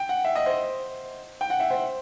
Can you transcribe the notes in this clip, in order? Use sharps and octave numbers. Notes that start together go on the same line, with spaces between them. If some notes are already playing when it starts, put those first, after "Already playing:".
Already playing: G5
F#5
E5
D#5
C5
G5
F#5
E5
C5